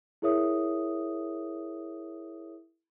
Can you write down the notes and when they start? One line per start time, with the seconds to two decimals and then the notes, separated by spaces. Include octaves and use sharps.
0.22 E4 G#4 A#4 C#5 E5 D#6